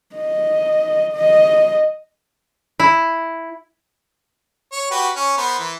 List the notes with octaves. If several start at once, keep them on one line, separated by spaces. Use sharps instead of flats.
D#5
D#5
E4
C#5
F#4 G4 B4
C#4
B3 A#4 C5
E3